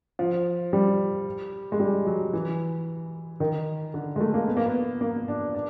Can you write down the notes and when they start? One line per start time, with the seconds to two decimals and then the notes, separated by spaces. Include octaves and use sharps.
0.19 F3
0.73 G3
1.72 G#3
1.80 G3
2.06 F#3
2.33 E3
3.40 D#3
3.94 D3
4.16 G#3
4.20 A3
4.34 A#3
4.48 B3
4.57 A#3
4.66 B3
5.01 A#3
5.28 D4
5.55 D4